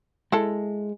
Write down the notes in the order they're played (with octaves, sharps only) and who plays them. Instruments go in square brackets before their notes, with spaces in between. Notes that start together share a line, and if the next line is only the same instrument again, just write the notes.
[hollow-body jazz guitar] G#3 [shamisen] E4 A4